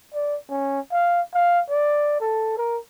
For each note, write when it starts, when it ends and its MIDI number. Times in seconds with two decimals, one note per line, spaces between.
0.14 0.37 74
0.50 0.80 61
0.91 1.21 77
1.34 1.61 77
1.70 2.20 74
2.20 2.53 69
2.58 2.78 70